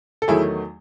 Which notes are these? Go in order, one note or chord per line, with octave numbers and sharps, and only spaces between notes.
A4
E2 D#3 F#3 A3 E4 G#4